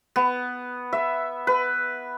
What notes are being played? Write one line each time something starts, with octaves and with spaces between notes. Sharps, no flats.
B3
E5
B4